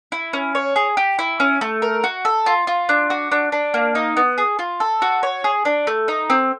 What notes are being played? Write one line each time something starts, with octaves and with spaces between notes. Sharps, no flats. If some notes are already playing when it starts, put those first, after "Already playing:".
E4
C#4
C#5
G#4
G4
E4
C#4
A3
A#4
F#4
A4
F4
F4
D4
F#4
D4
D4
A#3
D#4
B3
G#4
F4
A4
F#4
C#5
G#4
D4
A3
D#4
C4